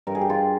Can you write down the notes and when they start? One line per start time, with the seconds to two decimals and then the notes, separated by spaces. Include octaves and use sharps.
0.07 G2 A#4
0.15 G#4
0.21 G4
0.30 F4 G#4